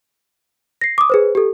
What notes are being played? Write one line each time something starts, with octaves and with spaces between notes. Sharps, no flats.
A#6 C7
D6 D#6
G#4 B4 C5
G4 A4